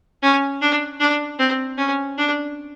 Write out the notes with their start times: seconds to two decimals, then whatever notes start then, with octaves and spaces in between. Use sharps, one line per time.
0.23 C#4
0.61 D4
1.00 D4
1.39 C4
1.78 C#4
2.18 D4